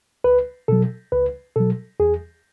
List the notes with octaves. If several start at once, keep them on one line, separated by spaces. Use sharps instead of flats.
C#2 B4
B2 F#3 A4
C#2 B4
B2 F#3 A4
E2 G#4